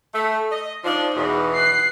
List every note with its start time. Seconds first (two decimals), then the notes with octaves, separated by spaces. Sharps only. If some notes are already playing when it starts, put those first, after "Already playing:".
0.14 A3
0.52 D#5
0.84 F3 D4 D#4
1.15 E2 B2
1.54 F#6 C7